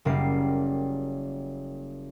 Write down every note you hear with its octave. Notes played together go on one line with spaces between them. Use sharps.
F#1 G3 A#3 C7